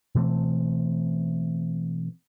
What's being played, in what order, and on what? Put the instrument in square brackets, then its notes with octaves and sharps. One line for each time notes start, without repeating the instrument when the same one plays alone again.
[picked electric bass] B2 E3 A3 C4